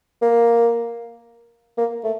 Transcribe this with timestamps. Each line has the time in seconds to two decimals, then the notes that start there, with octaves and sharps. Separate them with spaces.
0.22 A#3
1.77 A#3
2.04 A3